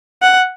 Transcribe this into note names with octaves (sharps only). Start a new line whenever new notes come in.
F#5